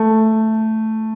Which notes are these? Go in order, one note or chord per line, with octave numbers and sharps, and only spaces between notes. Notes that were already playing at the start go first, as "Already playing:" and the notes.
Already playing: A3